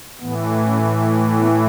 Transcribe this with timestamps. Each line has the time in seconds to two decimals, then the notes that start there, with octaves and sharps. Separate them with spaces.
0.20 A2 E3 B3
0.65 C#4
1.38 B3